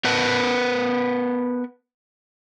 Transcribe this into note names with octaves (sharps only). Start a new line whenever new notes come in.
B3 A#4 B4 F#5 A5